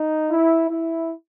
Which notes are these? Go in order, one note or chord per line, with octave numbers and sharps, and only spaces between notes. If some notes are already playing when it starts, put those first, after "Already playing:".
Already playing: D#4
E4
E4